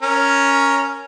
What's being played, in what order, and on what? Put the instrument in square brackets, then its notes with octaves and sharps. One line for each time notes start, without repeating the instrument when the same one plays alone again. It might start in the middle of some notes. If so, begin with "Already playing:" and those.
[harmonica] C#4 A#4